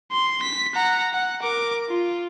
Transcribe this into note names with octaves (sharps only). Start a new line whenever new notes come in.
C6
B6
F#5 A#5
F#5
A#4 D6
F4